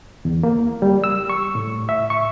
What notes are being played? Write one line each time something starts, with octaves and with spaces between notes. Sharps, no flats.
E2
A#3
G3
E6
C#6
A2
E5
C#6